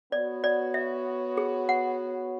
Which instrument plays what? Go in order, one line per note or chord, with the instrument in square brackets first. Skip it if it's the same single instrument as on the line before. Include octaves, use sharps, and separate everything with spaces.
[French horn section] B3 F#4 C#5 [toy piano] D5
[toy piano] D5
E5
G#4
F#5